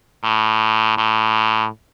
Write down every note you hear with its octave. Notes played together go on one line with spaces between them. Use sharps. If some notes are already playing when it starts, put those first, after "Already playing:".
A2
A2